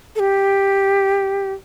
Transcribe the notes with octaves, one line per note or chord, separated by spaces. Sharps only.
A4
G4